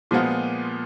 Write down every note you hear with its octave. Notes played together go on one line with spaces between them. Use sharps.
A#2 F3 G#3 B3 F4